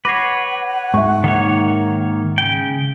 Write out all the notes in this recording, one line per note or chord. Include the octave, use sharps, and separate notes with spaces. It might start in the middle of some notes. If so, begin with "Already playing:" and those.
B4 C#5 F#5 D6 A#6 C7
G#2 E5 C#6
D#3 A#3 C#5
C#3 G5